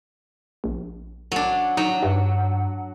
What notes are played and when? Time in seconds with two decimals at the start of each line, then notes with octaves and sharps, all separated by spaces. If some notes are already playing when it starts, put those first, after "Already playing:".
0.64 A#1
1.32 F#3 D4
1.77 F#3 D#4
2.02 G2